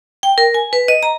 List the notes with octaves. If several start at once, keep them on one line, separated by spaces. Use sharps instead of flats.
G5
A#4
G#5
B4
D#5
A#5